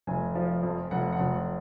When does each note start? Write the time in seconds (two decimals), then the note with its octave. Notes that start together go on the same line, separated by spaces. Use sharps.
0.07 F1 G#5
0.35 F3
0.63 F2
0.91 F1 F#5
1.13 F#5
1.20 F1